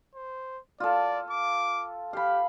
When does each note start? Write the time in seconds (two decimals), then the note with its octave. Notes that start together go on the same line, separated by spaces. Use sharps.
0.15 C5
0.80 F4 A4 D5
1.31 D6
2.13 G4 F5 B5